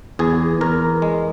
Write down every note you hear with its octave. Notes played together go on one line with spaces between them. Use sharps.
E2 G#4
E2 A#4
G#3